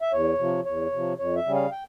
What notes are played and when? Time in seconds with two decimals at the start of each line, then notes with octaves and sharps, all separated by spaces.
0.02 E5
0.12 E2 C#5
0.39 C3 F3
0.65 E2 C#5
0.92 C3 F3
1.18 F2 C#5
1.36 E5
1.46 C#3 G3 C#4
1.54 F5
1.72 G5